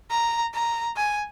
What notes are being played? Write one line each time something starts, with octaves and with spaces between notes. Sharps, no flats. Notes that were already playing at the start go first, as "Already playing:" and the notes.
A#5
A#5
G#5